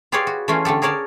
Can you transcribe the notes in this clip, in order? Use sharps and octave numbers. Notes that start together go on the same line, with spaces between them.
F4 G4 G#4 B4 C#5 D5
F#4
E3 A3 C#4 F4
D3 A3 G4 A4
G#4 A#4 C#5 D5 A5